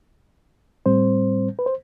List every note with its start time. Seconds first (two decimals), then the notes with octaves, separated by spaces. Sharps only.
0.86 A2 G3 C4 C5
1.59 B4
1.66 C5